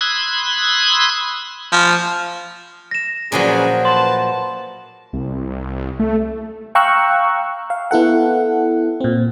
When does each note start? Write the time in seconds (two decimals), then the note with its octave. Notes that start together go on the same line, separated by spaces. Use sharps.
0.01 B5 C6 D#6 E6 F#6 G#6
1.72 F3
2.91 A#6 E7
3.32 A#2 F3 F#3 C#4 G#4 B4
3.85 B4 A5 C6
5.13 C2
6.00 A3
6.75 F5 G5 A#5 C#6 E6 F#6
7.70 F5
7.91 B3 E4 A4 F#5
9.00 A#2 C4